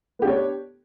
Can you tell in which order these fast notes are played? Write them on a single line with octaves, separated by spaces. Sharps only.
B3 G4 D4 C#5